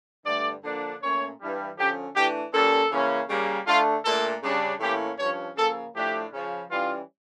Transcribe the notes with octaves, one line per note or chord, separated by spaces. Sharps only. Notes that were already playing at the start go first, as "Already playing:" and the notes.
G2 D3 A3 D5
D3 F3 A#3 D4
A#2 A3 C#4 C#5
G2 E3 G3
D3 F3 C#4 G4
E3 A3 D4 G4
A#2 G3 C#4 A4
C#3 E3 A#3 C#4
C#3 G3 A#3
D3 A3 D4 F4
A#2 A3 D4 A4
C#3 G3 D4
A2 E3 A#3 C#4 G4
G2 F3 C#4 C#5
C#3 F3 A#3 A4
A2 F3 A3 D4 G4
C#3 F3 C#4
E3 G3 C#4 F4